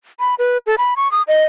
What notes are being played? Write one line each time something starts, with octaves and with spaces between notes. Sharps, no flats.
B5
B4
A4
B5
C#6
D#6
D#5